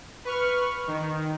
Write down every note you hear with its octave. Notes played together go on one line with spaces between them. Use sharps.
B4 C#6 F6
D#3